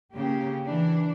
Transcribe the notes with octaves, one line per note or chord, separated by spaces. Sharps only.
C#3 A#3 G4
E3 D4